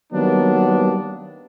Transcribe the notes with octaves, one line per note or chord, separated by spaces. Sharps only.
D#3 F#3 G3 A#3 B3 D4